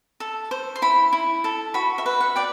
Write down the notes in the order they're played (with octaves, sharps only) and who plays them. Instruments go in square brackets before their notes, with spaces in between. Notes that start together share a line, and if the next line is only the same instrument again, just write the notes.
[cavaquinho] A4
C5
C6
E4 B5
E4
A4
F#4 B5
E5
B4
F#5
D5 G5